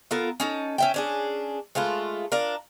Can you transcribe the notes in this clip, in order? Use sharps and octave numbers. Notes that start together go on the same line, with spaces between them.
B3 F4 A4 A#4
C#4 D#4 A4
C#4 E5 G5
C#4 D4 G#4
G#3 A3 F4 B4
D4 F4 A#4